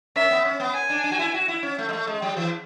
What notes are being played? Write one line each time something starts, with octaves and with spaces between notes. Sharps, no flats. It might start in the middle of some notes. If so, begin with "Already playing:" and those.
C#4 E5
B3
C#4
B3
G#5
D4
D4
F#4
E4
F#4
E4
C#4
A3
G#3
A3
G#3
F#3
E3